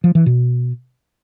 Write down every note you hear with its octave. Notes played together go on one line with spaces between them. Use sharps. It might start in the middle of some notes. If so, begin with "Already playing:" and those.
F3
E3
B2